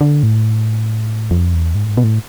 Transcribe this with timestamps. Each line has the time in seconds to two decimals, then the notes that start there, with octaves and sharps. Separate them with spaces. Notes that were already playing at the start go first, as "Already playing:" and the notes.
0.01 D3
0.23 A2
1.31 F2
1.54 E2
1.75 G#2
1.85 A2
1.89 G#2
1.97 B2
2.04 A2